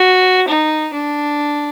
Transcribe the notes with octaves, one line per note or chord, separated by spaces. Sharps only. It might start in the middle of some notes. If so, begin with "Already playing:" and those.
Already playing: F#4
D#4
D4